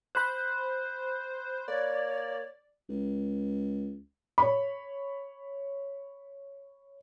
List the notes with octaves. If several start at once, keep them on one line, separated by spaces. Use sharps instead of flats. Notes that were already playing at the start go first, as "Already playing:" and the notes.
C5 B5 C6 F#6
A#3 C#5 D5
C#2
C#5 B5